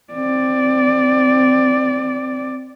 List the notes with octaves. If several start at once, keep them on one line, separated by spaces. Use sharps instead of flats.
C4 D5